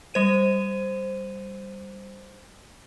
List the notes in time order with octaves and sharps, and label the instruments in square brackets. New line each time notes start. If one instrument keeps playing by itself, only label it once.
[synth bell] G3 C5 D#7